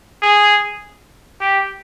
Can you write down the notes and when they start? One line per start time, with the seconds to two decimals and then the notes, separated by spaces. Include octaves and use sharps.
0.22 G#4
1.40 G4